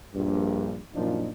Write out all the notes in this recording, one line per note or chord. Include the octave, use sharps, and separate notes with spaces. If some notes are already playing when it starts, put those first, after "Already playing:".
A#1 G2
F#2 A#2 F3 D4 D#4